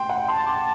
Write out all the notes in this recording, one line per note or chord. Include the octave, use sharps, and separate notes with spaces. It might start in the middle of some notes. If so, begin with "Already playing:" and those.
Already playing: G5 C6
F#5
A5 C6
D6